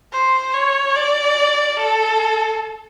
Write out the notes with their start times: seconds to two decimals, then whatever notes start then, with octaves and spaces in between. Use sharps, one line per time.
0.12 C5
0.54 C#5
0.95 D5
1.77 A4